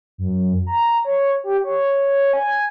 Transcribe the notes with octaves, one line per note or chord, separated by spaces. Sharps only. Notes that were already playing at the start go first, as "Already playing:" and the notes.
F#2
A#5
C#5
G4
C#5
G#5